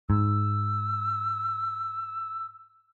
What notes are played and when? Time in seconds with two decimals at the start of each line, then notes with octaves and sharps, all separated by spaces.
0.10 G#2 E6